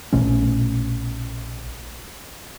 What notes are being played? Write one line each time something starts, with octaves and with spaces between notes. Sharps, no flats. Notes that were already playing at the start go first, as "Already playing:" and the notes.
A#1 B2 A3 C#4